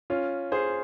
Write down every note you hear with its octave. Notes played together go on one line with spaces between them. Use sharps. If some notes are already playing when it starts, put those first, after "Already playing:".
C#4 F4
G#4 C5